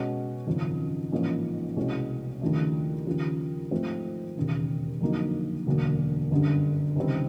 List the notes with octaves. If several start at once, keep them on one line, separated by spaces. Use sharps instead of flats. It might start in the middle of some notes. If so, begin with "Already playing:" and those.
Already playing: B2 G#3 C#4
G#1 F#2 C#3 F3
A1 G#2 F3 A#3 C#4
C2 B2 G#3 C#4
D#2 C#3 F3 A3 D4
D#2 C#3 F3
G#2 F3 A3 C4
E1 D#2 C#3
F2 D3 F#3 A#3 D#4
E1 D2 D3 F#3 A#3
G1 F#2 D3 G3
C#2 C3 D#3 G3 C4